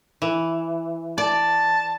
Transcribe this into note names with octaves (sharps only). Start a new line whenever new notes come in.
E3
D5 A5